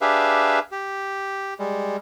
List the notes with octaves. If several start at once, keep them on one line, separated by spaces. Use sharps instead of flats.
D4 G4 G#4 B4 E5 F5
G4
G3 G#3